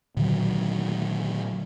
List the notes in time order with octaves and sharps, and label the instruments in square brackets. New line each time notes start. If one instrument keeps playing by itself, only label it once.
[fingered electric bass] A#2 D3 D#3 F#3